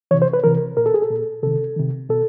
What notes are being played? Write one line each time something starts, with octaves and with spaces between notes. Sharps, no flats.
C3 E3 C#5
C5
B4
C3 E3 A#4
A#2 A#4
A4
G#4
A4
A#2
C3 D#3 A4
C3 D#3
B2 A4